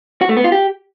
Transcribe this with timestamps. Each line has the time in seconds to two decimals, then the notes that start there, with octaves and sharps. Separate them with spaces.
0.21 F#4
0.29 A3
0.37 B3
0.44 F4
0.52 G4